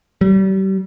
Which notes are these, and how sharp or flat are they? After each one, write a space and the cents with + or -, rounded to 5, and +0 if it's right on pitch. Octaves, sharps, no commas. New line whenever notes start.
G3 -35